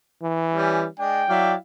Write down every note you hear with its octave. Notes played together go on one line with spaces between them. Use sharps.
E3
G3 C#4
G#3 D4 G5
F#3 E4 D5 F5